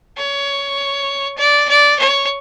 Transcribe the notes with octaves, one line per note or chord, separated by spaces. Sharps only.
C#5
D5
D5
C#5